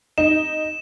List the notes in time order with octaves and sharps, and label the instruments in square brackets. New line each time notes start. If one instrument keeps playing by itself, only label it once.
[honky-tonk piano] D#4 [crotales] E7